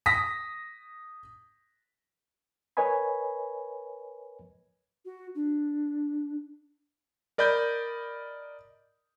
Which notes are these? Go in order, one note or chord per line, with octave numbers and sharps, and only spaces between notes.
D#6 A#6 B6
A#4 B4 C#5 D#5 G#5 B5
F#4
D4
A#4 D5 D#5 B5 G6